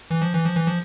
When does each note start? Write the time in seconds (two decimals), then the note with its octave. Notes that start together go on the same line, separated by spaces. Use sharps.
0.11 E3
0.22 F3
0.34 E3
0.45 F3
0.56 E3
0.67 F3